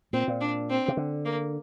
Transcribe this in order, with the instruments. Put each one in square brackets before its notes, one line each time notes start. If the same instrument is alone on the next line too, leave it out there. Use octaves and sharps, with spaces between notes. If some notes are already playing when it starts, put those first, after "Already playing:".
[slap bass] A#2 [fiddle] C4
[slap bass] A#2
[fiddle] D4
C4
[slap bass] C3
D3
[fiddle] A#3